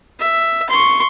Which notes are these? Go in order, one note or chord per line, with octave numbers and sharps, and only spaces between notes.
E5
C6 C#6